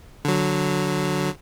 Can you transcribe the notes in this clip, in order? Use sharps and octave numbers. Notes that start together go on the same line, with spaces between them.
D3 F#3